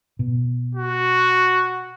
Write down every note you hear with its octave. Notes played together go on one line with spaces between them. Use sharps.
B2
F#4